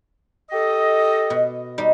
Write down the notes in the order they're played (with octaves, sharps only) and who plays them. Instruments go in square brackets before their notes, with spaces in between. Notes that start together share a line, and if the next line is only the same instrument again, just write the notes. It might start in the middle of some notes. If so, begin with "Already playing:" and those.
[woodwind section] G4 A4 D#5
[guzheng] B2
G3 D#4